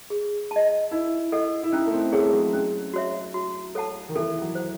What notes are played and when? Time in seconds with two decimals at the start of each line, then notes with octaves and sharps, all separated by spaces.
0.10 G#4
0.51 D#5 A5
0.91 D#4 E4
1.32 A4 D#5 F#5
1.63 E4
1.72 C#4 D#4
1.87 A3
1.93 C4
2.12 A3 G#4 C#5 F#5
2.26 G#3
2.33 F#3
2.53 C#4
2.94 F#4 C#5 E5
3.34 F#4
3.75 A4 C#5 F#5 A5
4.09 D#3
4.15 E3 A4
4.42 F#3
4.55 C5 F#5